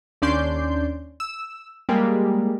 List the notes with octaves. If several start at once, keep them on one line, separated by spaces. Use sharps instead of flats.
D#2 C#4 D4 D5 C6 G6
E6
G3 G#3 A#3